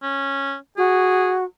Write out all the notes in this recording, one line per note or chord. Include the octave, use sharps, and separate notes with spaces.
C#4
F#4 G#4